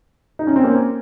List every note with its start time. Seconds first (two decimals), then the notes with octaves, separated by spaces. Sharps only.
0.39 D#4
0.47 C#4
0.56 C4
0.63 A#3 C#4